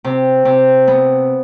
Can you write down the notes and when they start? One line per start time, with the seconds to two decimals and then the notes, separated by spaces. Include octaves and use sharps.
0.04 C3
0.45 C3
0.87 B3